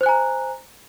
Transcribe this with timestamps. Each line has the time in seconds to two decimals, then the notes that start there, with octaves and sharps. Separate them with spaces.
0.01 C5
0.03 F#6
0.06 G#5
0.09 A#5